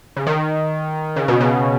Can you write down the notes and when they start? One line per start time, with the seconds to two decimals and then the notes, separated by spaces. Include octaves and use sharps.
0.16 C#3
0.27 D#3
1.16 C#3
1.28 B2
1.40 C#3